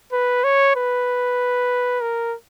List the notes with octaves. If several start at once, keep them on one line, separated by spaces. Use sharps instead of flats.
B4
C#5
B4
A#4